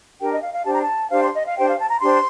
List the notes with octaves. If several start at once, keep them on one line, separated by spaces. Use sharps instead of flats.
D4 G4 A#4 G5
D#5
F5
F5
D4 G4 C5 A5
A#5
A5
D4 G4 C5 F5
C6
D#5
F5
D4 G4 C5 G5
F5
A5
A#5
D4 G4 C5 C6